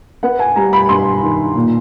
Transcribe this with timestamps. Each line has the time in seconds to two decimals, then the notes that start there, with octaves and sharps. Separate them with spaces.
0.23 B3 F#5
0.39 G#5
0.56 G3 A#5
0.73 B5
0.89 G2 C6
1.23 D#3
1.55 A#2